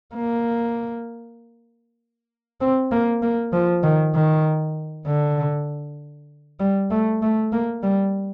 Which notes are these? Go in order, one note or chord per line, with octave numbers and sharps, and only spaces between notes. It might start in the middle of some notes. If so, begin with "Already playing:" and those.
A#3
C4
A#3
A#3
F3
D#3
D#3
D3
G3
A3
A3
A#3
G3